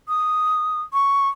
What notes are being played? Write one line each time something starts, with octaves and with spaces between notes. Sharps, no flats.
D#6
C#6